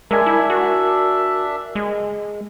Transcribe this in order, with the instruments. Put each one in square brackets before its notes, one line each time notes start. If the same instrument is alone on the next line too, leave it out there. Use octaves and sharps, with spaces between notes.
[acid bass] G#3 [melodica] D4 E5 [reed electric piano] A#4 G#5
[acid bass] E4
F#4
G#3